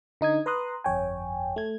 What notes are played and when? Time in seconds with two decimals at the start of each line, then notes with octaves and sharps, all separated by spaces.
0.21 D3 D#4 D#6 G#6
0.46 B4 A#5 C6 D#6 F#6
0.84 G1 F2 C#5 G5 G#5
1.56 A3 G#6